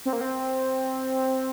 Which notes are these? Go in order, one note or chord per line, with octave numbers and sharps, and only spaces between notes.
C4
A#3
C4